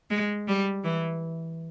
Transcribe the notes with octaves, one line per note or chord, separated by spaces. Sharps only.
G#3
G3
E3